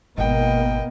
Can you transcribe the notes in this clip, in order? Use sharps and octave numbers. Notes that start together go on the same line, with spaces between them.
G#1 B2 A#3 B3 D#5 G5